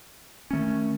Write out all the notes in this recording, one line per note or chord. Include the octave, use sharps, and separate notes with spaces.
D#3 F#3 A3 C#4